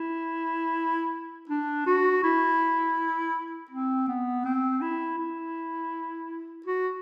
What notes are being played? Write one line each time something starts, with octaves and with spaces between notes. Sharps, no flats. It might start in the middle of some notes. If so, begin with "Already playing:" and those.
Already playing: E4
D4
F#4
E4
C4
B3
C4
E4
E4
F#4